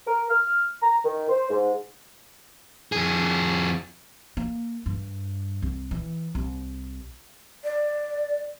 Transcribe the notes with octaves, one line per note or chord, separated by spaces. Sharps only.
A#4
F6
A#5
D#3
C5
G#2
F2 G#4
A#3
G2
C2
E3
C2
D5